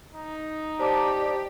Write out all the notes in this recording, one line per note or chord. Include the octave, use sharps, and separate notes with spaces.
D#4
G4 C5 D5 A5 D6